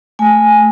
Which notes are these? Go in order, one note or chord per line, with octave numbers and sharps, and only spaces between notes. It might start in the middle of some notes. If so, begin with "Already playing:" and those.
A3 G#5